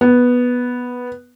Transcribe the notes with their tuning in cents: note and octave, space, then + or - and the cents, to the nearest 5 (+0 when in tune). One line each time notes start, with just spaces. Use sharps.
B3 -5